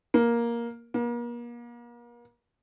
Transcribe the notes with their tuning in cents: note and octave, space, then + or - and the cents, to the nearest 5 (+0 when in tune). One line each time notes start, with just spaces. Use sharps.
A#3 +10
A#3 +40